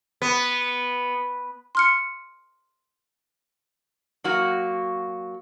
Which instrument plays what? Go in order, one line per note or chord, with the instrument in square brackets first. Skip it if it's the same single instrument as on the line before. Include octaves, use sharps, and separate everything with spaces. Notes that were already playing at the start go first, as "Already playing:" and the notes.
[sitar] B3
[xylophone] C6 F6 C#7
[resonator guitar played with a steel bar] F#3 A#3 F#4